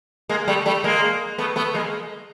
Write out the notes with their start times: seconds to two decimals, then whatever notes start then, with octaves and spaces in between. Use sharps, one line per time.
0.29 G#3 A#3
0.48 G3 A3
0.66 G3 A3
0.84 G#3 A#3
1.38 A3 B3
1.56 A3 B3
1.74 G#3 A#3